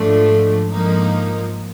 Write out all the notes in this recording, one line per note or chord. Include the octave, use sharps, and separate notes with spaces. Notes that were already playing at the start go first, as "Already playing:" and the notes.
Already playing: G#2 F3 A3 D4
G#2 F3 A#3 D#4